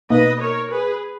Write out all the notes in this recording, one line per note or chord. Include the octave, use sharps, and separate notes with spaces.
B2 A#3 D#4 B4 D#5
A#4 C#5
G#4 B4